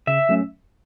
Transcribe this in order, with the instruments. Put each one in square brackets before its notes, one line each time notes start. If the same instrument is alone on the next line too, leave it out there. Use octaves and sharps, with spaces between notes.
[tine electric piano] C#3 [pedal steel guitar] E5
[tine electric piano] F#3 A3 C#4